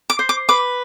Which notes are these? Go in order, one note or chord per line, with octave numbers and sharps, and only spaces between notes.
D6
C5
D6
B4 D6